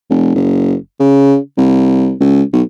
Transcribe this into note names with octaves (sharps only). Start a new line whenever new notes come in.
F1
F#1
C#3
C2
C#2
B1